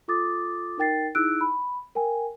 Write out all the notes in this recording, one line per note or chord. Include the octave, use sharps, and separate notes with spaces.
F4 A4 D6 D#6 A6
D#4 A#4 G5 A6 C7
D#4 E4 G#4 E6 F#6 D7
B5
A#4 G5 G#5